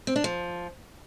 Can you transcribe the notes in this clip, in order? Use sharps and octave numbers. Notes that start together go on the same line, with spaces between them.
C4
D4
F3